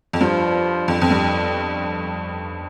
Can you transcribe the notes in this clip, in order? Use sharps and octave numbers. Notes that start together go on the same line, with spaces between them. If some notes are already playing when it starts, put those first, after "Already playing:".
F2
G2 F3
F2
F2
G2